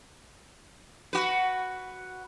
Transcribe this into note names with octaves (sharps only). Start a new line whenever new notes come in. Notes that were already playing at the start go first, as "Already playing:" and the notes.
F#4 B4